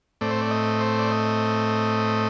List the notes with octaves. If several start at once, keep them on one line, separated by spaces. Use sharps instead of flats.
A2 A3 C4 D5
C5
D5
D#5
C5
D5
D#5